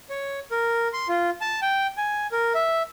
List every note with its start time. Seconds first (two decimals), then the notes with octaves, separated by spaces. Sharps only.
0.10 C#5
0.51 A#4
0.93 C6
1.09 F4
1.41 A5
1.62 G5
1.97 G#5
2.32 A#4
2.55 E5